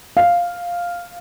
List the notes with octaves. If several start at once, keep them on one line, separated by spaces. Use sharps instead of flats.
F5